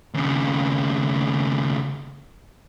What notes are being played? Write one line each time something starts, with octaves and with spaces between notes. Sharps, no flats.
D#2 C#3